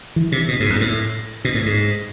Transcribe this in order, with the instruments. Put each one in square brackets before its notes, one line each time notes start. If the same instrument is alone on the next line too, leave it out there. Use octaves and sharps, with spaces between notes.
[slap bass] E3
C3
B2
G#2
F2
G#2
A2
B2
A2
G#2